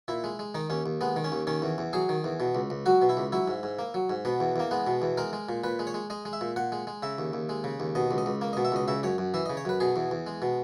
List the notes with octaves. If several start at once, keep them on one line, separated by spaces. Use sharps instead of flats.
A#2 E4
G#3
G#3
D#3 D#4
D#2 C#4
D#2
G#3 B3
D#3
C#4
D#2
D#3 C#4
E2
E2
F#3 G#4
D#3
E2
B2
C#2
C#2
F#3 F#4
B2
E4
C#2
F#3 E4
G#2
G#2
A#3
F#3
G#2
B2 B3
E2
E2 A#3
G#3 B3
B2
E2
G#3 A#4
G#3
A#2
A#2 B4
G#3
C#5
G#3
G#3 D#5
G#3
E5
A#2
A#2 F#5
G#3
G#3
C#3 E5
D#2
D#2
G#3
C#3
D#2
B2 D#5
C#2
D#5
C#2
A#3
D#5
B2
E5
C#2 D#5
C#3 E5
F#2 C#5
F#2
E3 E5
D#5
C#3
C#5
F#2 B4
B2 G#4
E2
E2
G#3
B2